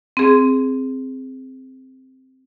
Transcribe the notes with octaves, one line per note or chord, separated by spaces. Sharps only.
C4 G#4